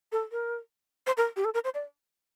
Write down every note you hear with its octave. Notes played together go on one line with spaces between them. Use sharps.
A4
A#4
C5
A#4
G4
A4
A#4
C5
D5